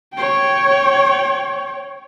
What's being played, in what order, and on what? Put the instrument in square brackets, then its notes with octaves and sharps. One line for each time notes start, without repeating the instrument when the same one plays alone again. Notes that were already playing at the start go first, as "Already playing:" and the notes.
[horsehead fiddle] C#5 G5